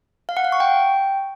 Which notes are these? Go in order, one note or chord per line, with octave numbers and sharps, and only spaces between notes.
F5
F#5
F5
C#6
G5